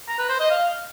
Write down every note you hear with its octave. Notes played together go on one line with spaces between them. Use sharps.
A#5
B4
C5
D#5
F5